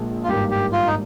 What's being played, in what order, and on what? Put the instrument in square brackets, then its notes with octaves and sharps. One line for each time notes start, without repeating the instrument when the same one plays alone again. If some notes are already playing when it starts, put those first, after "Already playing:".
Already playing: [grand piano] A#1 A#2 F3 G#3
[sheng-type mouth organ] F4
[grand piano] G#1 G2 G3 A#3 [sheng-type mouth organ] G4
[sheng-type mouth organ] G4
F4
D#4